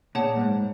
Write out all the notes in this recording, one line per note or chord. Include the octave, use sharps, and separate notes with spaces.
A#2 G#4 C#5 F#5 A5
G2
G#2